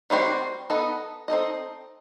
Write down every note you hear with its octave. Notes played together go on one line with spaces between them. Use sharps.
D#3 G3 C4 F#4 C5
B3 D#4 A4 D#5
C4 D#4 A4 D#5